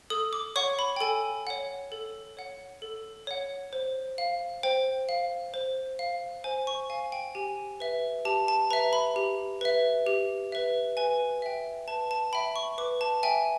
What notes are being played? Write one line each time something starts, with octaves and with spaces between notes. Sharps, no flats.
A4 D#6
D6
C#5 F#5 C#6
B5
G5
A4 G#5
C#5 F#5
A4
C#5 F#5
A4
C#5 F#5
C5
F5
C5 G5
F5
C5
F5
C5 G#5
C#6
F5 G#5
G5
G4 G#5
B4 E5
G4 A5
A5
B4 E5 A#5
B5
G4
B4 E5
G4
B4 E5
B4 G#5
E5 G5
B4 A5
A5
E5 G5 B5
C#6
B4 D6
A5
E5 G5 G#5